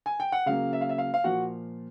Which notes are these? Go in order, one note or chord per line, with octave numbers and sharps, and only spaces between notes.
G#5
G5
F#5
C#3 F#3 A#3 F5
E5
F5
E5
F5
F5
A#2 F3 F#4 F#5